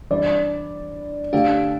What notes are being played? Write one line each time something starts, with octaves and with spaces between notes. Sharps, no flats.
E3 G3 D4 D5
D3 A3 D4 G4 F5